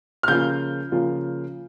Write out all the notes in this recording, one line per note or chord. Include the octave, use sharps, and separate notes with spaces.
F6
C#3 F3 A#3 F4 G6
C#3 F3 A#3 F4